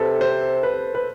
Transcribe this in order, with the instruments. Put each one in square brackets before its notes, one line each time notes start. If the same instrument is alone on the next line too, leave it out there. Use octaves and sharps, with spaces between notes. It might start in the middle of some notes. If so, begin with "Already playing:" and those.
Already playing: [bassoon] C3 [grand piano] A4 B4
[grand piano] C5
B4
B4